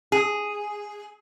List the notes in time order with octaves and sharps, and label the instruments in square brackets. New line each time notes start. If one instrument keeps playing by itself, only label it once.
[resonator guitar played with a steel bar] G#4